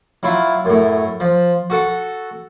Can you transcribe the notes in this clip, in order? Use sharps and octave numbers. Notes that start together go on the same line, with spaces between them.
F#3 E4 F4
F#2 A2
F3
F#4 A4 F#5